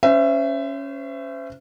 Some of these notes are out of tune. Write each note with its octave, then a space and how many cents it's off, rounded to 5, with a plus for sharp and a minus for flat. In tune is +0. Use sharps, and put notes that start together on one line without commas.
C#4 +0 C5 -30 E5 +20